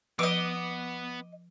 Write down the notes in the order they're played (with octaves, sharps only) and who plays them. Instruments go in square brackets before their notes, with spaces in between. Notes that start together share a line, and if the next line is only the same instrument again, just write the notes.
[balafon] F3 B4 [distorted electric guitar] B3 [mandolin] D#5 D6